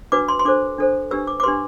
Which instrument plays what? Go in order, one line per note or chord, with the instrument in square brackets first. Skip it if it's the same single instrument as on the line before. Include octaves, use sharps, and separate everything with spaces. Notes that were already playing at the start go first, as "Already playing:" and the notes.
[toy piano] D4 F#4 B4 D6
C6
C6
D4 A4 C5 D6
D4 A4 C5
D4 G4 B4 E6
D6
D6
D4 G4 B4 C6